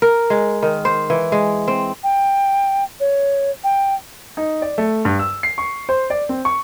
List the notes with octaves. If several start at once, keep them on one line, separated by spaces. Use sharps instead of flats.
A#4
G#3
D#3
C5
E3
G#3
C4
G5
C#5
G5
D#4
D5
A3
G2
E6
C7
C#6
C5
D5
C4
C#6